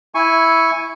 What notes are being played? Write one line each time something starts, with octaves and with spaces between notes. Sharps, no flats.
E4 G#5 C#6